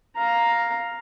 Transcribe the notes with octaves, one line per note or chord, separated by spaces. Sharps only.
F5 A#5